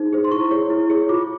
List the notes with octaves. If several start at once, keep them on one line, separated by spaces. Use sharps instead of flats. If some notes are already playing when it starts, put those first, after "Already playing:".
Already playing: D#4 G#4 C5
G#4 C5
C6
E4 C#6
G#4 C#5
E4
G#4 C#5
F4 D6